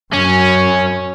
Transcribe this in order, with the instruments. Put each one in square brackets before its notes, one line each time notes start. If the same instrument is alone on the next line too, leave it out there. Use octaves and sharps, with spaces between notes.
[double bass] F#2 [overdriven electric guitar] C#4